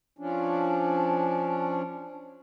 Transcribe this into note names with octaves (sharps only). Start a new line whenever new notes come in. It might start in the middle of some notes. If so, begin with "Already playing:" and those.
F3 C#4 D4